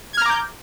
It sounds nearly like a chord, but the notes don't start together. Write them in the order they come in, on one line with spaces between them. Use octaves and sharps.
G#6 F6 A#5 D6 G6